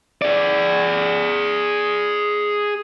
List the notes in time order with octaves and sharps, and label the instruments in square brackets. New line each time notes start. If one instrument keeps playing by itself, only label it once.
[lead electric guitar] G#4 D5